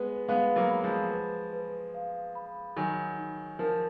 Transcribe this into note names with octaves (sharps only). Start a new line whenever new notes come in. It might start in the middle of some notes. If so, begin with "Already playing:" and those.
Already playing: G#3 B3 B4
G#3 B3 F5
F#3 A#3
B5
F3 G#3
B4
B4
F5
B5
D#3 F#3 G#5
D#4
F3 A#4